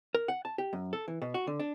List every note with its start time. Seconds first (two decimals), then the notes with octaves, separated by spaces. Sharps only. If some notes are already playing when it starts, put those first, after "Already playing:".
0.15 A#4
0.28 F#5
0.45 A5
0.58 G4
0.73 F#2
0.93 A4
1.08 E3
1.22 B2
1.34 F#4
1.47 D3
1.60 D4